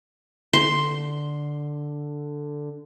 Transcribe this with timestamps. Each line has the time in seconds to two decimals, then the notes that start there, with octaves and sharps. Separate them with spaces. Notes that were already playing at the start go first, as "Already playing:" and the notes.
0.53 D3 C6